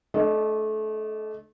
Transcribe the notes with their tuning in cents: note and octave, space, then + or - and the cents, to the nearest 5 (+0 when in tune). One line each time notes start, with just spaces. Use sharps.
A3 -25 D4 -25 D#5 +0